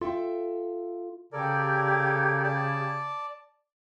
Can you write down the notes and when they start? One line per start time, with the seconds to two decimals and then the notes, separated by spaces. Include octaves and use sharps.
0.01 F4 A4 E5 G5
1.33 C#3 G4 A4 A#4 D5 G#6
2.43 D5 A5